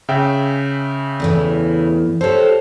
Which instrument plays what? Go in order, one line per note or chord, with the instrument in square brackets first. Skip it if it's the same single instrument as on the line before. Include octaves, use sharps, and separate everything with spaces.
[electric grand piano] C#3 E5 G5
[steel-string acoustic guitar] E2 A2 E3
[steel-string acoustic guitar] G4 A4 [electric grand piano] C5 C#5